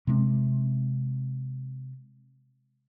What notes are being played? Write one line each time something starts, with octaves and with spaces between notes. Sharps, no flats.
C3 G#3 B3 C4